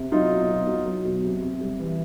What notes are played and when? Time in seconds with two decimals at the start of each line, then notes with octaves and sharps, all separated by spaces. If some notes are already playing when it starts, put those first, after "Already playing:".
Already playing: C3
0.12 F#3 D#4 F4
0.30 B2
0.49 B2
0.67 F#3
0.86 F#3
1.05 B2
1.24 C3
1.42 C3
1.61 G3
1.79 E3